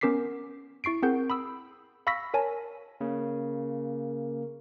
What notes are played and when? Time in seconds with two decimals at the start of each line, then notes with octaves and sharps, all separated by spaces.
0.01 B3 C#4 A#4 D6 B6 C7
0.84 E4 C#6 C7 D7
1.03 C4 G#4 A#4 F#5 G6
1.30 B5 D#6 E6
2.07 F5 B5 C#6 E6 A#6 B6
2.34 A#4 C#5 G#5 A5
3.01 C#3 A#3